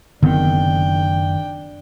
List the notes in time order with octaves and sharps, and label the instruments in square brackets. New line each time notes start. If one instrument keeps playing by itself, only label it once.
[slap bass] F#1 [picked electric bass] D3 B3 C4 [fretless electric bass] D#3 [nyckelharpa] D4 G5